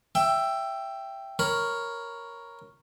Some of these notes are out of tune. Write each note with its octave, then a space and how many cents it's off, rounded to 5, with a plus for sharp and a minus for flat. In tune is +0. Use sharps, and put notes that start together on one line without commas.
E5 +15 G5 +0
A#4 +0 C#5 +0 B5 +0